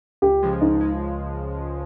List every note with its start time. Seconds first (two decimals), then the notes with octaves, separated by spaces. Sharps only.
0.22 C#2 G4
0.43 C#3 F3 G#3
0.61 C#2 D#4
0.81 G#3